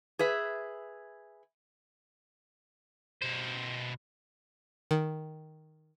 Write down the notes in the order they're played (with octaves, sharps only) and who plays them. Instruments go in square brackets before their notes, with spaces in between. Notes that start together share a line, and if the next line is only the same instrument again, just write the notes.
[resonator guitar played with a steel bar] G#4 B4 E5
[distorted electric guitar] B2 C5
[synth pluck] D#3